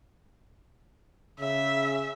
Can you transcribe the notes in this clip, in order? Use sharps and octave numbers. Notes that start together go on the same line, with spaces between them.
C#3 E5